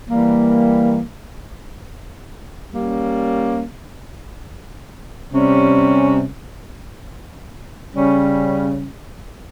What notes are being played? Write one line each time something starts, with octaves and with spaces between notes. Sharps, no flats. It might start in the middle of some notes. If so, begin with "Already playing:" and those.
E3 G3 A#3
G3 A#3 C#4
C3 G3 C#4
C#3 G3 C#4